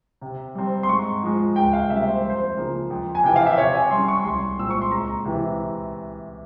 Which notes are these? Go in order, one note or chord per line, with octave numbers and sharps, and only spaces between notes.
C3
G3 C4
C6
G#2 C#6
F3 G#3
C#2 G5
F5
C3 G3 A#3 C#4 E5
C5
F2
C5
C#3 F3 A#3
F2
G#5
C3 E3 G5
F5
E5
C3 C#5
G#5
G3 C#4 C6
C#6
C2 C6
A#2 G#3 C4 E6
C#6
C6
C#2 A#5
C3 E3